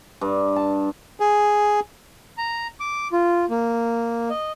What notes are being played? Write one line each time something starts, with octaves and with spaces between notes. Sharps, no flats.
G2
A5
G#4
A#5
D6
F4
A#3
D#5